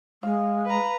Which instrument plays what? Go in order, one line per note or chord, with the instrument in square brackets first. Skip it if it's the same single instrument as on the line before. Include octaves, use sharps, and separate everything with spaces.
[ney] G#3 [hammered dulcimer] F5
[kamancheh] B4 A#5